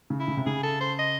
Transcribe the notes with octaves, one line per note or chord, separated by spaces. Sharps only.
C#3
E4
C#3
C3
C#3 G#4
A4
C5
D#5